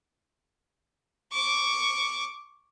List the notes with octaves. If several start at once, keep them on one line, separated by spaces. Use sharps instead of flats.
C#6 D6